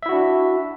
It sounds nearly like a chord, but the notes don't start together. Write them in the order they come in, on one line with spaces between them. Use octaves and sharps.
E5 E4 F#4 D4